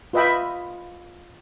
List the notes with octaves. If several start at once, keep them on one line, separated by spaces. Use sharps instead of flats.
F4 B4 D#5 E5 G5 B5